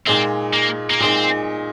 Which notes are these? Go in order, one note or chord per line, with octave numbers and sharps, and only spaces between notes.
A#2 G#3 C4 D#4
A#3
A#3
A#2 G#3 C4 D#4